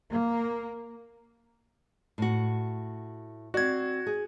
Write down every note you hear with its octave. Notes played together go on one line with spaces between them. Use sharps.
A#3
A2 F#4
C4 F#4 D5 G#6
G#4